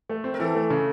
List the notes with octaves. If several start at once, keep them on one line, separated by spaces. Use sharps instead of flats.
A3
C4
A#4
E3 A4
A3
C#3